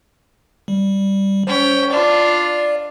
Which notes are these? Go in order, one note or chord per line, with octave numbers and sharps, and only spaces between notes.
G3
C#4 C5 G5
D4 F4 D5